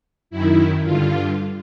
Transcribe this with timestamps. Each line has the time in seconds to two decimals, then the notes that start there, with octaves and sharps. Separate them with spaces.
0.30 F#2 D#3 E4
0.84 G2 D3 F4